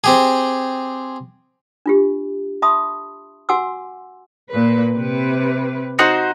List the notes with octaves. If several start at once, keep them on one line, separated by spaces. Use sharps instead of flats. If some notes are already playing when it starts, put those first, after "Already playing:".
C4 G4 G#4
D4 F4 G4
E5 A5 B5 C6 D#6
F#4 F#5 G#5 C6 D6 E6
A#2 B4
C3 B4
D#4 F#4 C5